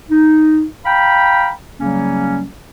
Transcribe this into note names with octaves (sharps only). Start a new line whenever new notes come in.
D#4
F5 G5 A#5 B5
C#3 F#3 G3 A#3 C#4